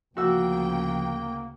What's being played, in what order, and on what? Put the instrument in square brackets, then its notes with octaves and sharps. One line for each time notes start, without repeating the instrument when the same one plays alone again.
[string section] D2 C#3 G5 [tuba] F3 [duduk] A#3 [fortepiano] F#4 E6